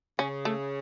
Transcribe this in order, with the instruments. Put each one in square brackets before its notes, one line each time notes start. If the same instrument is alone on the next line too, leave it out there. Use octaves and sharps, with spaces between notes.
[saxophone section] C#3 [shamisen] C#4
[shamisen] A3